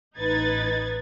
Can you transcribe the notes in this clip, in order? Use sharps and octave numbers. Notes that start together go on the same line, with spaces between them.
A1 D#4 B4 G#6 A6